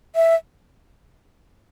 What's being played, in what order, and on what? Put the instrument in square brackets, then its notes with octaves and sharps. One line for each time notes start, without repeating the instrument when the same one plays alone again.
[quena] E5